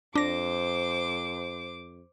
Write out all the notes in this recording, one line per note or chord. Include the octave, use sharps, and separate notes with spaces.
F2 D4 C5 D6 A#6